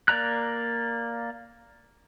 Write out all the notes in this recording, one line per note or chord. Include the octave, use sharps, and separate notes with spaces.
A#3 D5 A#5 F#6